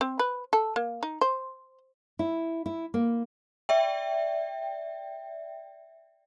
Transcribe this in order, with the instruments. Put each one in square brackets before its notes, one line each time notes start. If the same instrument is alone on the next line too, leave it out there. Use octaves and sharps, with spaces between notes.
[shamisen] C4
B4
A4
A#3
D#4
C5
[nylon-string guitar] E4
E4
A#3
[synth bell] D5 E5 G5